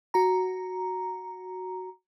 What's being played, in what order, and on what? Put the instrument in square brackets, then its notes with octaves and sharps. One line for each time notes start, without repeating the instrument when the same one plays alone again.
[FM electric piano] F#4 A#5